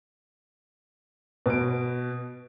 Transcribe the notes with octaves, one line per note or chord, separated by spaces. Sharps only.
B2 D7